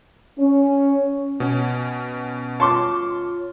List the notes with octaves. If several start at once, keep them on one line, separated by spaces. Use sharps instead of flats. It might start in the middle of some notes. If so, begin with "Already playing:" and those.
C#4
B2 C#4
F4 C#5 A5 C6 D6